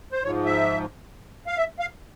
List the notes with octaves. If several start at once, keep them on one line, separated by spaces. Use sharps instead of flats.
C5
G#2 F3 C#5
E5
F5
E5
F5